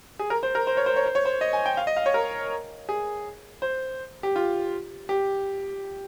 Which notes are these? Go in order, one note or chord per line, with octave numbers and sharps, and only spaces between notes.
G#4
A#4
C5
A#4
C5
C#5
C5
C#5
C5
C#5
C5
D#5
G#5
G5
F5
D#5
F5
C#5
A#4
G#4
C5
G4
F4
G4